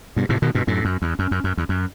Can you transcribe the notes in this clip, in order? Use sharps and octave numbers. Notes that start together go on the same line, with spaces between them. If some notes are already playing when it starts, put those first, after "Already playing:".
G2 B2
A2 C3
B2 D#3
G2 B2
F#2 A2
F#2
E2
F#2
F#2
F#2
E2
F#2